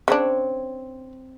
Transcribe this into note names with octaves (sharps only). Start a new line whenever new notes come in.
C#3 C4 D4 C#5